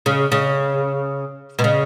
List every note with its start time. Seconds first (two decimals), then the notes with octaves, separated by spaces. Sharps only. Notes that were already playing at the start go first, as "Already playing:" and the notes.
0.06 C#3
0.32 C#3
1.59 B2
1.64 C#3